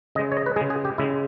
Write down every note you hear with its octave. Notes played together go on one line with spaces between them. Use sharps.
C#3 G#3 D#5
C#5
D#5
B4
C#3 G#3 G#4
G#4
G4
C#3 G#3 E4